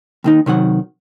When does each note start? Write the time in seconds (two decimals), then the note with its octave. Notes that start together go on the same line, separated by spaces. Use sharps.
0.24 D#2 D#3 D#4
0.46 C3 D#3 F#3 F#5